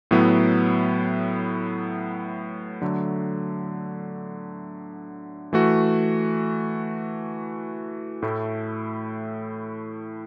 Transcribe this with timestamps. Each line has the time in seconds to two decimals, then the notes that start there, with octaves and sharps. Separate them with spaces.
0.11 A2 F#3 B3 E4
2.82 D3 F#3 A3
5.53 E3 A3 F#4
8.22 A2 A3 E4